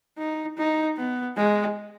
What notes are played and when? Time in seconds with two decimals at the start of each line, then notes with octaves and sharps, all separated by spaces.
0.18 D#4
0.57 D#4
0.97 B3
1.37 G#3